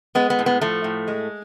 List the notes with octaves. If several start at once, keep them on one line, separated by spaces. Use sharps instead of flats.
G#3 B3
B3
A2
B3
F3 A3
A2
G#3